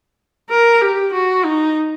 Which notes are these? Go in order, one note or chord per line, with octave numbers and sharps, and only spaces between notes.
A#4
G4
F#4
D#4